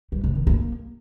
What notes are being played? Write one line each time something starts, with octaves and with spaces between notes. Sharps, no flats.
G3
C3
D#3
A#3